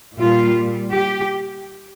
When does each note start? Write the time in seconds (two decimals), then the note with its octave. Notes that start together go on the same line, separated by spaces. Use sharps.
0.18 A#2 G3 F4
0.91 G4